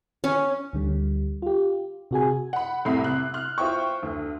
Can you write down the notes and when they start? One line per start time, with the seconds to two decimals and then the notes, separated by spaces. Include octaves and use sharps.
0.24 C#4
0.73 D2 D3 G3
1.42 F4 G4
2.11 C3 F#4 G#4 G#5
2.53 F#5 B5
2.85 C2 A2 C3 B5 C7
3.04 C3 F#6
3.34 F6 F#6
3.58 F4 C5 E5 G5 C#6
4.03 D2